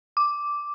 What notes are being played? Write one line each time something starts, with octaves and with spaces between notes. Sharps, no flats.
D6